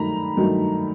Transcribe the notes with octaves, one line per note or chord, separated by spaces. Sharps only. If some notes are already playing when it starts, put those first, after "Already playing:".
Already playing: G2 D#3 F#3 A3 A#5 B5
G2 D#3 F#3 A3